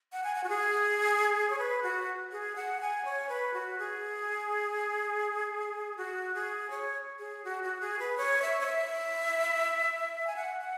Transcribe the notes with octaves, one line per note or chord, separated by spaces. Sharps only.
F#5
G#5
F#5
F#4
G#4
C#5
B4
F#4
G#4
F#5
G#5
C#5
B4
F#4
G#4
F#4
G#4
C#5
G#4
F#4
F#4
G#4
B4
C#5
E5
C#5
E5
G#5
F#5
F#5